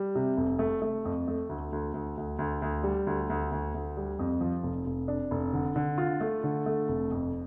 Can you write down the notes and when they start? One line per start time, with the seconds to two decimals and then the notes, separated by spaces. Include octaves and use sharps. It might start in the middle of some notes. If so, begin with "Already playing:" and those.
Already playing: G3
0.15 C3
0.37 F1
0.59 A3
0.82 A3
1.05 F2
1.28 A3
1.49 D2
1.72 D2
1.94 D2
2.17 D2
2.39 D2
2.62 D2
2.83 G3
3.07 D2
3.30 D2
3.52 D2
3.74 D2
3.97 G3
4.19 F2
4.41 F3
4.63 F1
4.86 F1
5.08 D4
5.31 F1
5.53 D3
5.76 D3
5.98 F4
6.21 A3
6.44 D3
6.66 A3
6.88 F1
7.11 F2